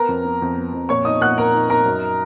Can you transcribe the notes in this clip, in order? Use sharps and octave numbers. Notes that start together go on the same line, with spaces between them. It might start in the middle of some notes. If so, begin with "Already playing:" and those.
Already playing: B3 A#4 A#5
F2
B3
F2
B3
F2
A#2 C#5 C#6
D#4 D#5 D#6
A#2 F#5 F#6
A#2 A#4 A#5
D#4
D#4 A#4 A#5
F#2